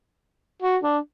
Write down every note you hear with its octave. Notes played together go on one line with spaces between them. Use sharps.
F#4
D4